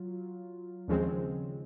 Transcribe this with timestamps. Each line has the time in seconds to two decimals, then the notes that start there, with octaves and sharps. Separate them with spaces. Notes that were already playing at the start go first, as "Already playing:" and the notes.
Already playing: F#3 F4
0.88 D#2 C#3 F3 G#3 C4